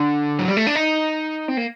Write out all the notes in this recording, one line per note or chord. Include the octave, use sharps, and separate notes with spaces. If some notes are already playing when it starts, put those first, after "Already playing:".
Already playing: D3
F#3
G3
A3
D4
D#4
C4
A#3